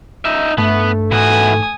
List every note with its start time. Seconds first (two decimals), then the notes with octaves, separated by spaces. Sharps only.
0.25 D#4 E5
0.58 G2 A3 B3
1.12 G#2 E3 F#4 G#5 D#6